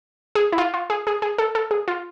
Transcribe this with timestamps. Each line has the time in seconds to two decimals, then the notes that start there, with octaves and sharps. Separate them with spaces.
0.35 G#4
0.52 E4
0.58 F4
0.74 F4
0.90 G#4
1.07 G#4
1.22 G#4
1.38 A4
1.55 A4
1.71 G#4
1.88 F4